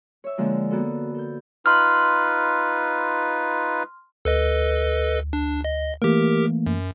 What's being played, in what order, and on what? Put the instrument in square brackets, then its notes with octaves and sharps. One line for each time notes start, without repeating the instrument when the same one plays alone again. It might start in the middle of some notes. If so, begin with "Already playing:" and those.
[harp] C#5 E5
D3 F3 G#3 A#3 F4
A#3 B3 F#4 A4
A4 G6
[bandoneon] D#4 F4 B4 [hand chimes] C6 F6
[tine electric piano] D2 [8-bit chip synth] A4 B4 D#5
[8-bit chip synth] D4
D#5
[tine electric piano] E3 A3 A#3 [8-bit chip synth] G4 A#4
[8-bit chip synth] F#2